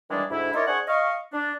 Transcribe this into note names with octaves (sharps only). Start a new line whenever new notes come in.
D#3 E3 G3 G#3 D4
D2 G#2 D4 E4
D#4 E4 A#4 C#5 D5 C6
D4 G#4 C5 F#5 G#5 C#6
D#5 F5 C#6
D4